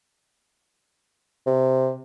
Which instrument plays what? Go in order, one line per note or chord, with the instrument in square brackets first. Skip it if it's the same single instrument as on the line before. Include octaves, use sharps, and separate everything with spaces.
[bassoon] C3